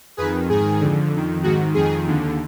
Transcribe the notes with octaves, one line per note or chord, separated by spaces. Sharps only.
F2 D#3 G#4 B4
G#2 D#3 G#4
F2 D3
F2 D#3
G#2 D#3 F#4
F2 D#3 G#4
D#2 D3